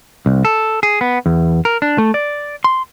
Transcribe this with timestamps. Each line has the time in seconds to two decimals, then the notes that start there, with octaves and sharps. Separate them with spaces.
0.26 C2
0.45 A4
0.83 G#4
1.01 B3
1.26 E2
1.65 A#4
1.82 D4
1.98 A3
2.14 D5
2.64 C6